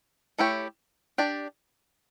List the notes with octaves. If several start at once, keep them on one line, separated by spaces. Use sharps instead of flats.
A3 E4 G4 C#5
D4 G4 D5